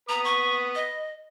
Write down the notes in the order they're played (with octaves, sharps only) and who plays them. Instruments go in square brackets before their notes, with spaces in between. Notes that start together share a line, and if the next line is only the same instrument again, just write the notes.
[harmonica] B4 D#6 [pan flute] A#5
[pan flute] C#6
D#5